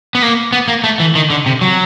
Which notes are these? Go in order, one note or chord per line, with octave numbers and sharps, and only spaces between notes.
B3
A#3
B3
A#3
A3
E3
D#3
D3
C3
F#3